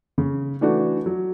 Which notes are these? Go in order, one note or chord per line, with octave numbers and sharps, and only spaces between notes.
C#3
E3 A3 D4 F#4
F#3